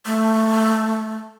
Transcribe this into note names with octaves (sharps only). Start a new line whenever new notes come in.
A3